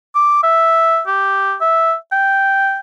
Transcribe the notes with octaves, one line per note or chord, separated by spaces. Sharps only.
D6
E5
G4
E5
G5